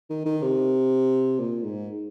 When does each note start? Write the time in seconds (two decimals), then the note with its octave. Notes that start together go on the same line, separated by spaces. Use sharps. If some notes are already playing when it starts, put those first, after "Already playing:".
0.10 D#3
0.25 D#3
0.42 C3
1.39 A#2
1.63 G#2